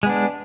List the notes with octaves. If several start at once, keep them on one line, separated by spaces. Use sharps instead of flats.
G#3 B3 D4